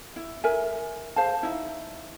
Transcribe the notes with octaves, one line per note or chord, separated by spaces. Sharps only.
E4
A#4 E5 G#5
G#4 C5 F5 A5
D#4 E4